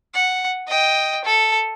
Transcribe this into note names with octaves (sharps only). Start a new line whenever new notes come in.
F#5
D#5 G5
A4